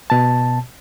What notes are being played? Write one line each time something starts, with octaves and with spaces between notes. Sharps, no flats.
B2 A5